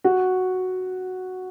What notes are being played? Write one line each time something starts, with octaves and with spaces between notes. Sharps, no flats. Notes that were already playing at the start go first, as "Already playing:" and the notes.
F#4